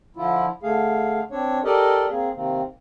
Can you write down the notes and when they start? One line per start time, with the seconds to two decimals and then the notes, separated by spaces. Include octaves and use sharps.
0.16 D3 F3 E4 F4
0.63 D3 A3 G#4 F5
1.31 C4 D4 C#5
1.64 G4 A4 A#4 D5 D#5
2.10 A#3 C4 G#4
2.35 C3 D#3 A#3 C4